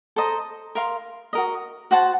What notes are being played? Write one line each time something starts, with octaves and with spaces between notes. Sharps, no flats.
A4 C5 D#5 A#5
A#4 F5 C6
F#4 A#4 D#5
F#4 C5 F#5 A5